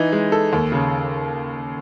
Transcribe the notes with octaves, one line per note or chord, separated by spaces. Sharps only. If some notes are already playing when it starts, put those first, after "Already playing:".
Already playing: E3 D#4
G#3
A4
D#2
C#3